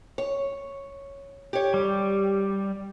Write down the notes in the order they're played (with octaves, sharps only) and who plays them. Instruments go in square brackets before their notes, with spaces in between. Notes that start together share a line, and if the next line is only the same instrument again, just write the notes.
[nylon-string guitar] C#5
G4 C#5
[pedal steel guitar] G3